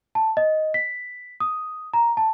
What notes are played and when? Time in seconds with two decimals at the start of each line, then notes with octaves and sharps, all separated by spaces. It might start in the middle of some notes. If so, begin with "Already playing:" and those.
0.15 A5
0.37 D#5
0.74 B6
1.40 D#6
1.94 A#5
2.17 A5